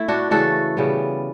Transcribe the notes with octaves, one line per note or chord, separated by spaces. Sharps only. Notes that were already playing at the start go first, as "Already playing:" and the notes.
Already playing: A3 E4
D4 F#4
C#3 E3 A3 F#4 A4
C#3 G3 B3